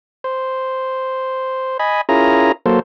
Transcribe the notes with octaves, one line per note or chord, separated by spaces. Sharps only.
C5
D#5 G#5 B5
C#4 E4 F4 G#4 A#4 A#5
F#3 A#3 A4 C5